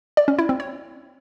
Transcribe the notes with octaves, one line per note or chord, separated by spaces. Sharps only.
D5
C#4
E4
C4
C#5